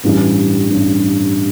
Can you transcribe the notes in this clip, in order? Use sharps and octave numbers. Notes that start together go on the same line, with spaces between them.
A1 G2 E3 G3
A1 G2 E3 G3